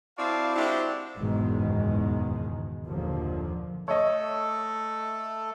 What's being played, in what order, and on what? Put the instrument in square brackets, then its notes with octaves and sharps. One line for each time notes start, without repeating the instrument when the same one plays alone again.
[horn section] C4 E4 F#4 D5 F5 A5
G#3 C4 D4 E4 F#4 G4
[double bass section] F#1 E2 G#2 B2 D#3 G#3
F#1 D#2 A#2 D3 F3
[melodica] A3 A4 [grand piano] C#5 D#5